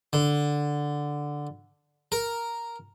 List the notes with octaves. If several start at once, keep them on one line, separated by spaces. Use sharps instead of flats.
D3
A#4